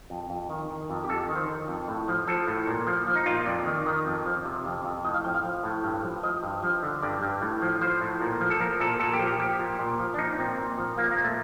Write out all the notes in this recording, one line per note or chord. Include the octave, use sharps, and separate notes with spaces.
F2
F2
D#3
D#3
F2
G4
F2 A4
D#3
C5
D#3
F2
A2
F3
F3 A4
A2
A#2
F3
F3
D#4
A#2 F4
F2 D5
D#3
D#3
F2
F3
C3
F2
F2
A2 D#5
F5
F3 G5
F5
F3
A2
G2
F3
F3 D#5
G2
F3
D3
G2 D5
G2
A2
F3
F3 C5
A2
A#2
F3
A4
F3 A#4
A#2 A4
A#2 A4
G4
F3
F3 G4
A#2
A#2
F3
D4
F3 D#4
A#2 C4
A#2
F3
F3 A#3
A#3
A#2
A3